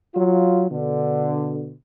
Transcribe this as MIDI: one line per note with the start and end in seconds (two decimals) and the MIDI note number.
0.15 0.67 54
0.15 0.67 65
0.71 1.74 47
0.71 1.74 50